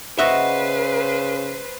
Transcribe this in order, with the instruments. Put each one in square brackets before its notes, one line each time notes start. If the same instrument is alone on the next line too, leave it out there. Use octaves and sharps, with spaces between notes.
[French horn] C#3 [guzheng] F#4 D#5 F#5 [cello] B4 C5 [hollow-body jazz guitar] E5